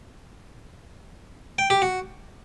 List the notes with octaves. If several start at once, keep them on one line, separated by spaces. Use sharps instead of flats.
G5
G4
F#4